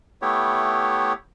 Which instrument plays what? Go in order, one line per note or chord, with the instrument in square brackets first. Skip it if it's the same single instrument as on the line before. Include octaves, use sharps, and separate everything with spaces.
[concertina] A3 B3 E4 G4 C#5